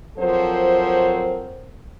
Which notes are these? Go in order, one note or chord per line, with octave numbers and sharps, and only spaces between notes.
F3 F#3 C4 A4 A#4 C5